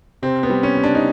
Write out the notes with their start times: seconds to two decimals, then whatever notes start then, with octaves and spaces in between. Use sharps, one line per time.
0.22 C3 C4
0.43 B3
0.50 G3
0.63 C#4
0.77 G3
0.84 D4
0.95 D#4